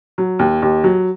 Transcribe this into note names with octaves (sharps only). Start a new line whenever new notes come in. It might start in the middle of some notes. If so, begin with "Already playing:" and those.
F#3
D#2
D#2
F#3